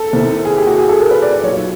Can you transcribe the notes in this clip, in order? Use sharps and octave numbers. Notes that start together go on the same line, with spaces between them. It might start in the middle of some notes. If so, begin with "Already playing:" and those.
Already playing: A4
C2 C3 D#3
G#4
G4
F#4
G#4
A4
A#4
B4
D5
D5
B1 A#2 F#3 C#5